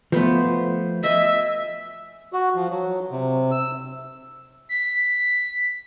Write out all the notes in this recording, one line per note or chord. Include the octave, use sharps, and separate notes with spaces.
F3 A3 B3 C5
D#5 E5 G#5
F#4
F3
F#3
C3
E6
B6